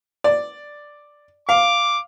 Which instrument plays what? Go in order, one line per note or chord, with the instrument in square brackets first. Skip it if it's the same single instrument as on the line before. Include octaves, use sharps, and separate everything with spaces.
[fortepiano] D5
[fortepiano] F5 [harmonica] D6